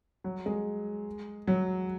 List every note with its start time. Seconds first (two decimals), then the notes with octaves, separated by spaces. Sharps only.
0.24 F#3
0.46 G#3
1.48 F#3